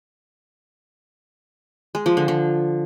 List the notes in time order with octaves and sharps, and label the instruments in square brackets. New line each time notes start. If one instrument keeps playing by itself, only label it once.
[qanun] G#3
F3
D3
D3